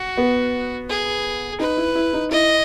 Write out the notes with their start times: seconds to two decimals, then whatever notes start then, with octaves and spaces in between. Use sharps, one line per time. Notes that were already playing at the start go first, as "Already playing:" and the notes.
Already playing: F#4
0.17 B3
0.89 G#4
1.60 D#4 B4
1.77 E4
1.95 E4
2.13 D#4
2.31 E4 D#5